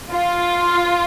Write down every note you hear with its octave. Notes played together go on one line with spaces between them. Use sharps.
F4